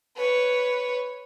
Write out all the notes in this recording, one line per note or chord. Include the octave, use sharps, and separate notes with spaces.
B4 C#5